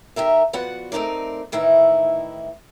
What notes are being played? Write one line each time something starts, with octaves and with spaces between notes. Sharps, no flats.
D#3 G4 A#4 E5
F3 B3 F#4 D5 F#5
A3 C4 D#4 A#4 D5
A2 D#3 E3 D#4 E4